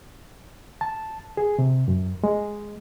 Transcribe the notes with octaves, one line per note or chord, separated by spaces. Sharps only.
A5
G#4
C3
F#2
G#3